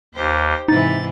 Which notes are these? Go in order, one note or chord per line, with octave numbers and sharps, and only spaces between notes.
D#2 D#4 G4 C5
G#2 C3 E3 D#4 A6